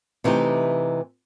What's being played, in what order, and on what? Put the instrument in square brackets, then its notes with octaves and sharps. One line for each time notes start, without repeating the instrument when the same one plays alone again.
[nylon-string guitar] C3 E3 A3 D#4 G4